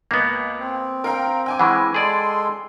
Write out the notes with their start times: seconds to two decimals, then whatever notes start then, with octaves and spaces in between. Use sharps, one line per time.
0.11 C#2 A#3 B3
0.60 C4
1.04 A#4 F5 G5
1.46 G5 G#5 D6
1.60 E3 G#3 F#5 B5 C#6
1.94 G#3 G#4 A4 D5 C6